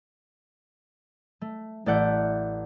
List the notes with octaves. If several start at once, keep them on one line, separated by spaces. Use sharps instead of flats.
A3
A1 A3 D5 F#5 G6